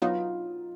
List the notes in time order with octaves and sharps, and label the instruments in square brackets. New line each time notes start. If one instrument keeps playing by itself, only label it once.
[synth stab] F#3 B3 D#4 [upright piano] F4